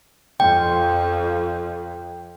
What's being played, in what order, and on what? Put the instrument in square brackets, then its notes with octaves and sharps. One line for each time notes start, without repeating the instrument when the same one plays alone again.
[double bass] F2 [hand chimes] G5